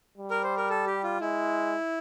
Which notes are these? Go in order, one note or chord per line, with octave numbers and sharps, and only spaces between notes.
G3
A#4
C5
A#4
A4
G4
F4
G#3 E4